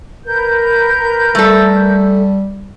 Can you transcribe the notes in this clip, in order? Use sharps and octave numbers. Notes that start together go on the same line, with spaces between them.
A#4 B4 G6
G3 A3 A4